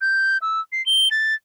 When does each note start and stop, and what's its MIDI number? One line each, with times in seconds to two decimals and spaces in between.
0.01 0.38 91
0.42 0.60 88
0.72 0.84 96
0.86 1.09 103
1.11 1.35 93